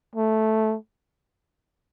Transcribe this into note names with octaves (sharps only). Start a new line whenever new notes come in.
A3